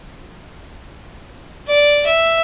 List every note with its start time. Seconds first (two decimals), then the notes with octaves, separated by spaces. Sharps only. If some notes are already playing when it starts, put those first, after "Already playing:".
1.68 D5
2.07 E5